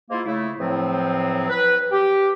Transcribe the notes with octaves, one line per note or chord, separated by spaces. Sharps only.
G#2 A#3 E4 F4
C#3 A3 E4
E2 A2 F3 F#3 C4
B4
G4